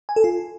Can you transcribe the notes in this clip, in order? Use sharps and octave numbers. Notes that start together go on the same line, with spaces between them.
G#5
A4
F4